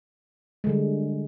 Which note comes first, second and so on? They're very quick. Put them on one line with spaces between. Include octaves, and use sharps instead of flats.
G#3 D3 G3